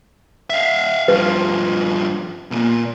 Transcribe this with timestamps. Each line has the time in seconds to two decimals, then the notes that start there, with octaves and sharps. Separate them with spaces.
0.50 E5 F5
1.08 G2 F3 B4
2.51 B1 A#2